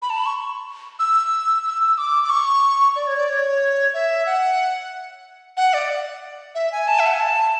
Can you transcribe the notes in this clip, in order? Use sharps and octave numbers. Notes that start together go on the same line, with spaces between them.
B5
A5
B5
C#6
E6
E6
D6
D6
C#6
D5
C#5
D5
C#5
E5
F#5
F#5
D5
E5
G#5
A5
E5
F#5
G#5
A5